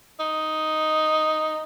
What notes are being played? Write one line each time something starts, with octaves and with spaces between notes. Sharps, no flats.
D#4